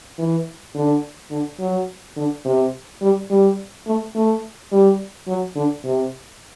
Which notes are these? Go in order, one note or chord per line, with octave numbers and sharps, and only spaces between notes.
E3
D3
D3
F#3
D3
C3
G3
G3
A3
A3
G3
F#3
D3
C3